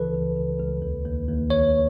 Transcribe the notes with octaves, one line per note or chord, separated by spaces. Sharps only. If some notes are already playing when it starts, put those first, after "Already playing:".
Already playing: C#2 C#3 E3 A4 B4
C#2
C#2
C#2
D#2
D#2
D#2
D#2 C#5